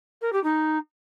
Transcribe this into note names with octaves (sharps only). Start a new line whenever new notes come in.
A#4
G4
D#4